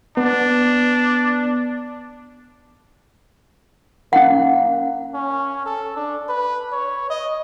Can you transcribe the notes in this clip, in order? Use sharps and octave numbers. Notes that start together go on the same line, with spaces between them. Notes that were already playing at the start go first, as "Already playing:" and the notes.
B3 D4
A#3 C#4 F#5
C#4
A4
D4
B4
C#5
D#5